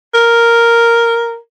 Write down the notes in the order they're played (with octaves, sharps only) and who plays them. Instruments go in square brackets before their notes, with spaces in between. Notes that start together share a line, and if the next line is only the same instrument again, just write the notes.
[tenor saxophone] A#4